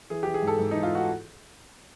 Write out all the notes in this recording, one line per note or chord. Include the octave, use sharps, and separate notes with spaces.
E3 G#4
E3 G4
G#4
G#2
A4
G#2
E3 D#4
F4
F#4